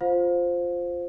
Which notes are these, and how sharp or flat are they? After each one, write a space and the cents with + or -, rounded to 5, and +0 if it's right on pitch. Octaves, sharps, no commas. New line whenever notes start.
F4 +0 C5 +0 F5 +30